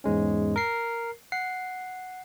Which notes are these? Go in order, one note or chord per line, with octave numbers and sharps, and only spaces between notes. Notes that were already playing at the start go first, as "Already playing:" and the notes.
E2 G#2 G#3 C#4
A#4 C7
F#5 C7